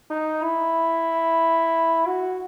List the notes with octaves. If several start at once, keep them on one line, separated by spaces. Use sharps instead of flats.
D#4
E4
F#4